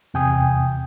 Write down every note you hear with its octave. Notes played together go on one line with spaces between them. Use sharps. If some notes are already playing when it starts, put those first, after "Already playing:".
E2 C3 G5 G#5 D#6